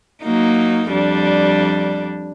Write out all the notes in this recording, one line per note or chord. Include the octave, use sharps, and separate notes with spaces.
F#3 A#3 D#4
F2 G3 D4